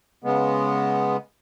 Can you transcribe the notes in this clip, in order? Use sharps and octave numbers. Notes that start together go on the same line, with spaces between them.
C#3 G#3 B3